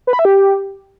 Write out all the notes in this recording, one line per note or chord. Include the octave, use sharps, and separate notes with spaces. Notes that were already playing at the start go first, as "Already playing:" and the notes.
B4
B5
E5
G4